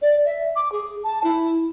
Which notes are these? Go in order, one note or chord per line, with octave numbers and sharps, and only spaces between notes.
D5
E5
D6
G#4
A5
E4